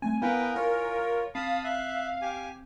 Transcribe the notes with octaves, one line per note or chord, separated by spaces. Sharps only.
G3 A3 C4 G#5
B3 E4 A#4 B4 F5 G5 G#5
F4 A#4 C#5
C4 F5 A5 B5 D#6
E5 F#6
G4 G#5